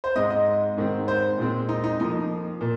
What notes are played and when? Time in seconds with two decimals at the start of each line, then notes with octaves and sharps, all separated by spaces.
0.04 C5
0.15 G#2 G#3 C4 D#5
0.30 D#5
0.77 G#2 D#3 G#3 C4
1.08 C5
1.38 A#2 G#3 C4
1.69 D#4
1.84 D#4
2.00 F2 F3 A#3 D#4
2.61 A#2